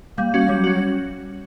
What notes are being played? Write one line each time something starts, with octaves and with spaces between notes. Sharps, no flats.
G3 A#3
C#4 F#4
F#3 G3
C#4 F#4